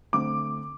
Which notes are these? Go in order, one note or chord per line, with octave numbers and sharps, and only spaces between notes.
D3 A3 C4 D6